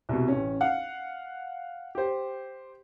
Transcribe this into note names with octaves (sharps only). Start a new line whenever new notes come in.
C2 B2
A1 C#4
F5 F#5
G4 C5